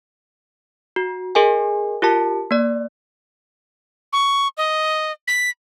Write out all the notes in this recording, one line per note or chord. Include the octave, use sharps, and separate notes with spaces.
F#4
G#4 A#4 D#5 G#5
F4 G4 A#4 A5
A#3 D5
C#6
D#5
B6